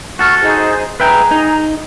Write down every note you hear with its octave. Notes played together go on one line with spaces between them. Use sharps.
F#4 A4 C#6 F6
D#4 G#4 C5
G#4 B4 E5 G5 A#5
D#4